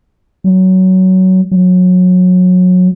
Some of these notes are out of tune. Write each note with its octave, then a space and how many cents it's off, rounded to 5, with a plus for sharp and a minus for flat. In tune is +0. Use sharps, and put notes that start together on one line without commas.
F#3 +15
F#3 -25